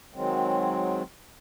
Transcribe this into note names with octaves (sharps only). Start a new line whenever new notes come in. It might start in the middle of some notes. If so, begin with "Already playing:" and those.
D#3 F#3 G#3 C4